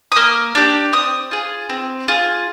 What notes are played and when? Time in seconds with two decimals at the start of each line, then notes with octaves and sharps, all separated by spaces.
0.12 D#6
0.16 A#3 F6
0.55 D4 G4
0.93 C4 D#6
1.31 F4 G#4
1.70 C4
2.08 F4 G#4